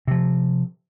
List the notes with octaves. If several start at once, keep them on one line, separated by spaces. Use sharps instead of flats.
C3 F3